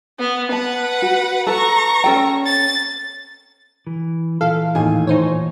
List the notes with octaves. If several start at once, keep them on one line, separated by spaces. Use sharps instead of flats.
B3
B4 F#5 A5
F#4
A4 B4 A#5 C#6
C#4 A4 G5
A6
E3
A#2 E3 F4 A4 F5
D#2 A2 G#5
D#4 C5 C#5